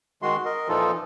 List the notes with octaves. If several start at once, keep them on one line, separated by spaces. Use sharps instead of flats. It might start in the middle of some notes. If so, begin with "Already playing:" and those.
D#3 G#3 F#4 C6
A#4 D#5
A#2 E3 F3 D#4 F4 A4